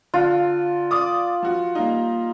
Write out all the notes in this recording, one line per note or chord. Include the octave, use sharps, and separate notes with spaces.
D3 F4
D5 D6 D#6
F3 F#4
G3 A#3 D#4